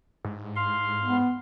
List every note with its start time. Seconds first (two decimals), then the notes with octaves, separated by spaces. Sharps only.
0.25 G#2
0.56 F5 C6
1.02 B3